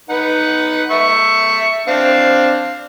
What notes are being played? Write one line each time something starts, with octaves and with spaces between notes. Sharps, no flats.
D#4 B4 F#5
E5 C#6
C4 D4 F5